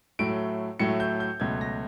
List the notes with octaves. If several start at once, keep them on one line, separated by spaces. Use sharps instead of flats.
A2 F#3 A3 D7
A2 F#3 A3 C#7
G6
G6
C#2 B2 F#3 A3 G#6
A#6